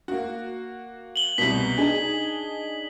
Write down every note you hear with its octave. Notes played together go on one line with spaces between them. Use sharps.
A#3 F#4
F#7 G7
C2 B2 B6
D4 D#4 G#4